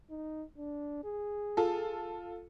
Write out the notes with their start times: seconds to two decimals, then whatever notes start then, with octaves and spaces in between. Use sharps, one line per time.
0.10 D#4
0.58 D4
1.04 G#4
1.57 F4 A4